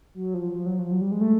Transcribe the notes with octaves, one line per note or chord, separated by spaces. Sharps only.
F#3
F3
F3
F#3
F3
F#3
G3
G#3
A3